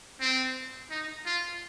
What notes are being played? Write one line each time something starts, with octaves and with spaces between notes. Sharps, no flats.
C4
D#4
F4